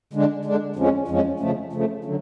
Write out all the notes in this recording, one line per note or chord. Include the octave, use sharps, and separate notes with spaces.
D3 G#3 D4
D3 G#3 D4
F2 F3 G#3 C#4
F2 F3 G#3 C#4
C#3 F3 A3
C#3 F3 A3
D3 F#3